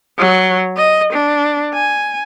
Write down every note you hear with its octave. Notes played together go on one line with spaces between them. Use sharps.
F#3
D#5
D4
G#5